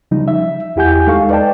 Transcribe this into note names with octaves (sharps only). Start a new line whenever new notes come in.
C#3 F3 G3 D#4
E5
E2 E4 G4 F#5 G#5 G6
D#2 G#3 D#4 A4 F5 C#6
B4 D5 D#5 G5 A5